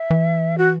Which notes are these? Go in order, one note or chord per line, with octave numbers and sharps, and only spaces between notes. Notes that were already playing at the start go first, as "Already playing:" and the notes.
Already playing: E5
E3
F#4